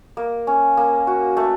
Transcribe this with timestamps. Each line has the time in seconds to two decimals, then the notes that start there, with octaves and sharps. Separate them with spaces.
0.17 A#3
0.47 C#4
0.77 A#3
1.07 F#4
1.37 A3